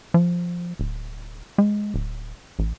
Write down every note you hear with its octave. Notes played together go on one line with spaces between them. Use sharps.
F3
D1
G#3
D1
A1